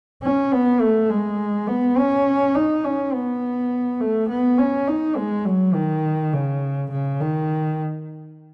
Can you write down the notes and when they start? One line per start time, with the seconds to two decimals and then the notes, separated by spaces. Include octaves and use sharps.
0.23 C#4
0.52 B3
0.81 A3
1.10 G#3
1.68 B3
1.98 C#4
2.55 D#4
2.84 C#4
3.13 B3
4.00 A3
4.29 B3
4.58 C#4
4.88 D#4
5.16 G#3
5.45 F#3
5.74 D#3
6.33 C#3
6.91 C#3
7.20 D#3